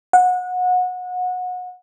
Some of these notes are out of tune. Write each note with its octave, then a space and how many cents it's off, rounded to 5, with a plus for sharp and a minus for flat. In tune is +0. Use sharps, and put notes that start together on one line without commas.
F#5 -25